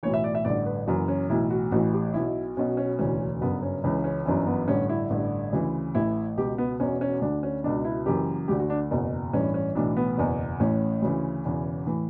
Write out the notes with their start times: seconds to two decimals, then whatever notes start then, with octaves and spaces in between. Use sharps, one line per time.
0.03 B1 A2 E3 C#5
0.14 E5
0.24 D5
0.35 E5
0.45 A1 G2 D3 D5
0.66 B4
0.87 F#1 F#2 E3 F#4
1.08 C#4
1.30 B1 A2 E3 E4
1.51 F#4
1.72 A1 A2 E3 F#4
1.93 G4
2.14 B1 B2 E4
2.57 B1 B2 C#4
2.77 C#4
2.99 E1 D2 C#3 E3 C#4
3.41 G1 F#2 C#3 B3
3.63 C#4
3.84 C#2 C#3 E3 C#4
4.04 C#4
4.25 G1 F#2 E3 C#4
4.47 B3
4.68 A1 G2 D3 C#4
4.89 E4
5.10 A1 G2 D3
5.53 D2 C#3 E3
5.95 A1 A2 E3 E4
6.37 C#2 B2 G4
6.58 B3
6.79 E1 E2 B2 C#4
7.01 C#4
7.22 D2 D3 D4
7.43 C#4
7.64 C#2 B2 D4
7.85 E4
8.06 F#1 F#2 E3 G4
8.48 D2 D3 G4
8.60 F#4
8.70 D4
8.91 F#1 E2 B2
9.33 A1 G2 E3 C#4
9.54 C#4
9.75 B1 A2 E3 D4
9.97 B3
10.18 F#1 E2 B2
10.60 A1 A2 E3 C#4
11.02 D2 C#3 E3
11.45 E1 E2 C#3 E3
11.87 A2 E3